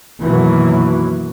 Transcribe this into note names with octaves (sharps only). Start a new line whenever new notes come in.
F#2 B2 D#3 E3 F#3 A#3